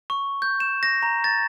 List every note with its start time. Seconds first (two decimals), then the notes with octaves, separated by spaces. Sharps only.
0.10 C#6
0.42 G6
0.60 E7
0.83 A#6
1.03 A#5
1.24 A6